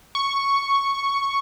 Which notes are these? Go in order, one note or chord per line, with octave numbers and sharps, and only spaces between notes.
C#6